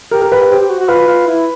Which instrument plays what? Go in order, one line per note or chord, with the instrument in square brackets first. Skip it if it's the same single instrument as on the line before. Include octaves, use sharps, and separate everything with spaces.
[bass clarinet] G4 [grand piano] A#4
[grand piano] A#4
[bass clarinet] G4 [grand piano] B4
[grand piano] B4
[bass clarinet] G4 [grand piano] C5
[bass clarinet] G4
F#4
F#4
[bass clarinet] F4 [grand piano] B4
[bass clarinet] F4
E4